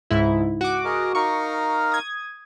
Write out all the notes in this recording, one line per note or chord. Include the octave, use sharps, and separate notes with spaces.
C#2 G#2 E4
F#4 D6
G#4 A#4 D#5
D#4 A#4 F5 C#6
D#6 G#6